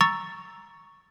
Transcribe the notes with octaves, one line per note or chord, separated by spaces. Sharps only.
A#5 C#6 E6 A6